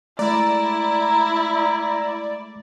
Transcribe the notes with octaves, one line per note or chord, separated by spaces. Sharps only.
G#3 A3 E4 D5 A#5